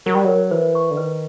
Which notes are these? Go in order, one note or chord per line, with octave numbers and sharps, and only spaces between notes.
F#3 A#4
G3
F#3 A#4
E3 C5
C#6
D3
D#3 B4